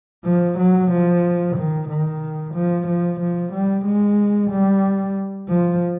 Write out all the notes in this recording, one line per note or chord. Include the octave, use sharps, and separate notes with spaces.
F3
F#3
F3
D#3
D#3
F3
F3
F3
G3
G#3
G3
F3